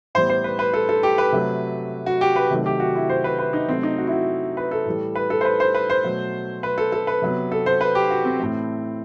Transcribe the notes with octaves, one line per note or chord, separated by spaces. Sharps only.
A2 E3 G3 B3 C5
C5
B4
B4
A4
A4
G4
B4
C3 F#3 A3
F#4
G4
B4
C3 D#3 F#3 A3
G4
F#4
E4
C5
B4
B4
D#4
C3 F#3 A3 C4
D#4
F#4
E4
F#4
B4
A4
A2 E3 G3
B4
A4
C5
B4
C5
B4
C5
B2 F#3 A3
B4
A4
A4
B4
C3 F#3 B3
A4
C5
B4
G4
F#4
C4
A2 E3 A3